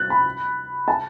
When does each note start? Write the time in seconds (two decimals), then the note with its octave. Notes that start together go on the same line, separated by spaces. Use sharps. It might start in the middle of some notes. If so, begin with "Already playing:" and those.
Already playing: F#6 A6
0.10 B5
0.88 A5